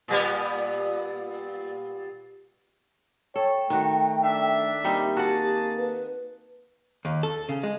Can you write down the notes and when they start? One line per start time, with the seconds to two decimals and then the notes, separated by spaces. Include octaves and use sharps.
0.08 A#2 G3 B3
3.36 A4 C#5 G5
3.70 D#3 A3 F#4
4.24 D4 E5
4.84 G3 A#3 C4 D#4 G4
5.17 F#4 G#4 F#5 A5
5.78 B4
7.05 D#2
7.23 A4
7.49 C#3
7.63 G#3